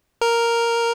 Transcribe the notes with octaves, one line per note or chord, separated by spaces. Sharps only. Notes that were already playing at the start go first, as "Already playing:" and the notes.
A#4